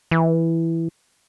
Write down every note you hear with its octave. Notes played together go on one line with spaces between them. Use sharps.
E3